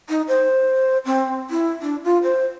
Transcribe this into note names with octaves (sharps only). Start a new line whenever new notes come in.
D#4
C5
C4
E4
D4
F4
C5